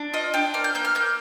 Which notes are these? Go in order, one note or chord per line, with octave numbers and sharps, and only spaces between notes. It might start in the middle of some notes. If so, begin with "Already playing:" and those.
Already playing: D4
F4 D#5
D4 G5
A#3 F6
G6
A#3 G6
F6
A#3 G6